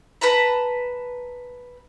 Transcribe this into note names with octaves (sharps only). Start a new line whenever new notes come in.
B4 A5 A#5